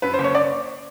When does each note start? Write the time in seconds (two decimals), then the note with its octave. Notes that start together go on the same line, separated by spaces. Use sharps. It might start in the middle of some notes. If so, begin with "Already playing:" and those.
0.02 F#2 B4
0.14 C5
0.19 F#1
0.24 C#5
0.35 D5